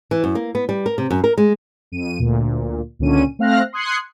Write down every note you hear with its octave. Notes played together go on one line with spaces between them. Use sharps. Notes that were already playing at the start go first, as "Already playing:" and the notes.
E3
F#2
A#3
B3
G3
A#4
C3
F#2
A#4
G#3
F2 D#7
D2 A#2
C#2 A#2 D3 C#4 D#7
A3 C4 F5 F6 F#6 A#6
C6 D#6 F#6 G#6 C7 C#7